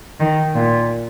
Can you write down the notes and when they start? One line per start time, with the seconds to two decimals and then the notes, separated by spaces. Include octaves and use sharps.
0.19 D#3
0.54 A#2